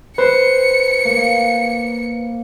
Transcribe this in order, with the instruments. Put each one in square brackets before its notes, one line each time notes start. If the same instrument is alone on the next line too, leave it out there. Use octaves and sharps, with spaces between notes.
[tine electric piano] B4 [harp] C5 [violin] C#7
[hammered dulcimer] A#3